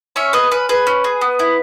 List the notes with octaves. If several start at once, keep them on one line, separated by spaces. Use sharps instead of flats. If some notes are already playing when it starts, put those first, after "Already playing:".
C#4 C#5 E5
G#4 B4 D#5
C#4 B4
G#4 B4
C#4
G#4
B3
E4